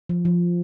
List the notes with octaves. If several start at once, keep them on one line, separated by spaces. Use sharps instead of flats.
F3
F3